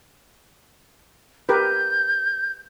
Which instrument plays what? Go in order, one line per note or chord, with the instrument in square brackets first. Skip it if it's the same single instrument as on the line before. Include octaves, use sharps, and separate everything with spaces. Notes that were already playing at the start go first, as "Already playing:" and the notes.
[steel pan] G4 A#4 B4 [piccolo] G6